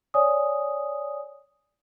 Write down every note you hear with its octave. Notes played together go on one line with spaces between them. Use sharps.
C#5 D5 G#5 D#6